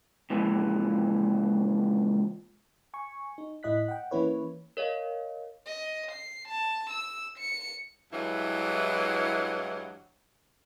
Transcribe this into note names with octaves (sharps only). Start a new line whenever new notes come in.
C#2 A#2 E3 F3
G#5 C#6
D#4
A2 E4 D#5 F#6 B6
F#5 G5
E3 A#3 C#4 E4 B4 C#5
A#4 C#5 D#5 F5
D#5
C7
A5
E6
C#7
G2 E3 F#3 G#3 E4